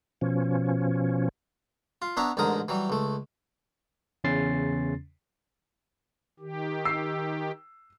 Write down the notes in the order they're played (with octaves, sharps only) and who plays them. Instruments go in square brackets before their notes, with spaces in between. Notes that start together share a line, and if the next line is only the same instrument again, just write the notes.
[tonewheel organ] B2 F3 C#4
[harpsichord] F4
B3 D4 C#5 E5 A#5
A1 G#2 D3 A#4 D#6
E3 F#3 G3
C#2 A3
[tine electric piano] E2 C#3 C#4 C6 A6 C7
[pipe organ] D#3 G4
[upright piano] E6 C7